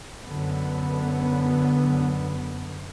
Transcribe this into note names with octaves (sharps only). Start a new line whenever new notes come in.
F#2 D3 B3